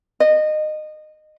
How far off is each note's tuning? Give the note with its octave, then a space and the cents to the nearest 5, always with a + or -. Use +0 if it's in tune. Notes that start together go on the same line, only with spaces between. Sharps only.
D#5 -20